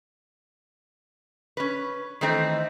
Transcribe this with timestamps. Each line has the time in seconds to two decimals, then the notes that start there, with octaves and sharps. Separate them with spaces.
1.57 C#4 B4
2.21 D#3 E3 A3 C4 D#4